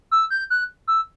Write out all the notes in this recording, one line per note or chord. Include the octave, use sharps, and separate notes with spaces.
E6
G6
F#6
E6